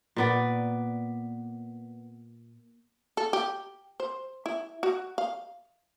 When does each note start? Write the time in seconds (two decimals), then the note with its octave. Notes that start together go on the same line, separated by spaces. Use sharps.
0.16 A#2 B3 D5
3.17 A4
3.33 G4
4.00 C5
4.46 E4
4.83 F#4
5.18 F5